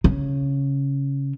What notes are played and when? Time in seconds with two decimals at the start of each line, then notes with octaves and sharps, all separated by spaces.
0.04 C#3